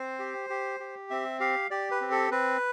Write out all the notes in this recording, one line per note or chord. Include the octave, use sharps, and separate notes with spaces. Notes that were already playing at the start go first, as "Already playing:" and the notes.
Already playing: C4 C5
G4
G4
G4
C4 E5
G4 F5
G4 D5
B4
C4
A4
C4 B4